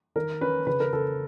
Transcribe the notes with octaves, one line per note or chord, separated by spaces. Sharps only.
D#3 A#4
C#4 B4
C#3 B4
A#4
C#3 A4